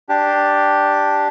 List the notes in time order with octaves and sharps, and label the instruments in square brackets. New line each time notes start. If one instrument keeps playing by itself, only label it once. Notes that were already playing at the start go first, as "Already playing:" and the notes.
[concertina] D4 G4